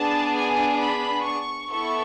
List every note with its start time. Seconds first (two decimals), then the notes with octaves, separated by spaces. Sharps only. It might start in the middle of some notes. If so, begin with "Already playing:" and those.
Already playing: B3 D4 G#4 A5
0.36 G#5
0.80 B5
1.25 C#6
1.70 B3 E4 A4 C#6